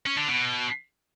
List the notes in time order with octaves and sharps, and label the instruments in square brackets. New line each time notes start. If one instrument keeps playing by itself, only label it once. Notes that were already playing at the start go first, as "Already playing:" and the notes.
[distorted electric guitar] C#4
D3
B2